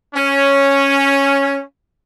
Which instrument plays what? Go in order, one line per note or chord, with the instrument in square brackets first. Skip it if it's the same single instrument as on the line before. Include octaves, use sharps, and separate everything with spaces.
[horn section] C#4